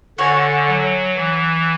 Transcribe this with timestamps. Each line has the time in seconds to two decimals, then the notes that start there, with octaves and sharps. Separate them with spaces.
0.18 D3 F#4 C#5 G#5
0.67 F#3
1.16 E3